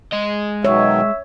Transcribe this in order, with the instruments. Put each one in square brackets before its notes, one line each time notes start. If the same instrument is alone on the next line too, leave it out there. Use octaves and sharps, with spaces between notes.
[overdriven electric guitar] G#3 D#5
[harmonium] B2 D#3 F#3 [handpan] C#5 [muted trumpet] E5